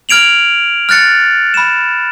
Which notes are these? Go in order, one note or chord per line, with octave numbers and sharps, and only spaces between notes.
F6 G#6 D7 F7 F#7
F6 F#6 A6 C#7
B5 E7